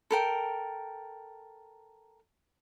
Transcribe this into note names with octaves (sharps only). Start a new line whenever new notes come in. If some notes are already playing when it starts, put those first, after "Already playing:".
A4 A#4 G5